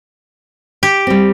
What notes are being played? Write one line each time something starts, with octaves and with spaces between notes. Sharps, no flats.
G4
G3 C4